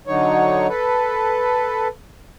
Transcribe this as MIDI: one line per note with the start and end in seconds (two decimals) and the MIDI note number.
0.07 0.67 50
0.07 0.67 54
0.07 0.67 63
0.07 0.67 73
0.68 1.88 69
0.68 1.88 71